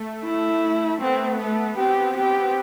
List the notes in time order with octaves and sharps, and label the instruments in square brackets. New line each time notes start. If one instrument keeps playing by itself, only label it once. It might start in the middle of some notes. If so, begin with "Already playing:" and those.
Already playing: [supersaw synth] A3
[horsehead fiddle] E4
[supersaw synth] B3 [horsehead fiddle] C4
[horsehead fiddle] A3 [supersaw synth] B3
[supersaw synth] C4 [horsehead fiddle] G4
[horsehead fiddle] G4